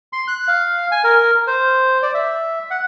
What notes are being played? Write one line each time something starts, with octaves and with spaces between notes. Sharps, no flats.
C6
F#6
F5
G#5
A#4
C5
D5
E5
F#5